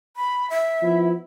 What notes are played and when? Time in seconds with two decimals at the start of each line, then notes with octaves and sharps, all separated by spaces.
0.16 B5
0.50 E5
0.82 F3 B3 E4